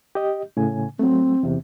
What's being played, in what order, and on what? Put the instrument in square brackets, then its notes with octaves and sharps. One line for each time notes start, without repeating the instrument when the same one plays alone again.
[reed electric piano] G4 D#5
A2 C#3 G#5
[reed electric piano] F#3 A3 [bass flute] C4
[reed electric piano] E2 C3